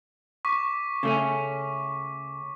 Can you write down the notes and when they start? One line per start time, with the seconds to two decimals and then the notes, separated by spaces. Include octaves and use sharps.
0.45 C#6 D6 B6
1.03 C#3 A3 C#4